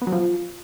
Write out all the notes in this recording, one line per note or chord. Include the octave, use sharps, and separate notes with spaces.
B3
F#3
F3